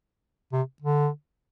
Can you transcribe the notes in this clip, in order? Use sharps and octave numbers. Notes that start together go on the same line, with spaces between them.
C3
D3